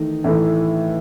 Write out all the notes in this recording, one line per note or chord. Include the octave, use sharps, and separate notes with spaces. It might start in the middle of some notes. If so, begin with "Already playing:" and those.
Already playing: D#3 E3 A3 D#4
A2 E3 A3